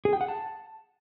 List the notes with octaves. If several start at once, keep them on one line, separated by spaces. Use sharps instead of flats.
G#4
G5
F#5
A5